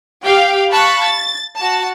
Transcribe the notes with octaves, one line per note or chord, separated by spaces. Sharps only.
G4 F5 G5
F5 A5 B5 C#6 F#6
A6
F#4 A5